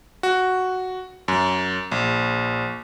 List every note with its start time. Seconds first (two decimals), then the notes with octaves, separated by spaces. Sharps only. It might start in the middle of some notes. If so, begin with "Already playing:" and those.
0.23 F#4
1.28 F#2
1.92 A#1